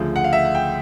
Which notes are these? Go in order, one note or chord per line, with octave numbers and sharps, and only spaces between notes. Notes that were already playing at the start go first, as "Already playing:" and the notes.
Already playing: D2 C#3 F3
F#5
F5
E5
F#5
G5